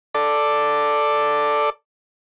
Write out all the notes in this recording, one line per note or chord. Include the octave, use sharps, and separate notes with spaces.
A4 D5